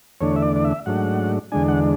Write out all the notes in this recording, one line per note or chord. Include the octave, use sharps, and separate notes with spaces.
E2 D3 A3 D4 C#5
E5
D5
D5
E5
G#2 F#3 A3 D4 F#5
E2 D3 G#3 D4 G#5
F#5